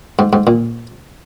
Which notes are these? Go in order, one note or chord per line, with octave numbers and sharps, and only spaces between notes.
G#2
G#2
A#2